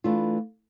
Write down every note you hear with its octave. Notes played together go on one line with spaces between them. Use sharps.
E3 A3 D4 F4